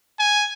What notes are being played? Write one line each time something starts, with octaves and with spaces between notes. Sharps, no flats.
G#5